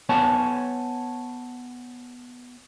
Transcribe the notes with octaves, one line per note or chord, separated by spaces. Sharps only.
B3 C#5 G#5 A5